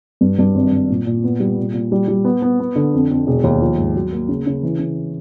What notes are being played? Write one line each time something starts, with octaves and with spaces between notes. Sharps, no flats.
G2
G2
G#1
G#1
A#2
A#2
B3
G3
A#2
A#2
G3
G3
B3
B3
B3
D3
F2
F2
E1
D#2
F3
G#2
F#3
A#3
C#3
C#3
E3
C#3